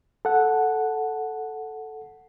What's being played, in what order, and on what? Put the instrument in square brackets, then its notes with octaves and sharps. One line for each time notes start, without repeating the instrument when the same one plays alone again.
[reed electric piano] A4 F#5